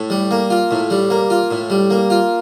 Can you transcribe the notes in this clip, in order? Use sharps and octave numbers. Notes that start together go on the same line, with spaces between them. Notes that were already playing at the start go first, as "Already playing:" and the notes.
Already playing: A2
G3
A#3
F4
A2
G3
A#3
F4
A2
G3
A#3
F4